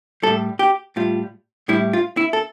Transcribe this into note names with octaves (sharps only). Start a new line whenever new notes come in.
A2 G3 A4
G4
A2 G3 F4
A2 G3 E4
F4
E4
A4